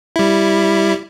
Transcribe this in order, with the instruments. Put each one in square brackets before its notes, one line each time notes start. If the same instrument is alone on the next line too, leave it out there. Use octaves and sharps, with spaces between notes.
[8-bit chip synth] G3 E4